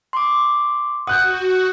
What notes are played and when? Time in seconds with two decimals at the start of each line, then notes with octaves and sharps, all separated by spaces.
0.13 C6 D6
1.07 F#4 F#5 D#6 F#6 G6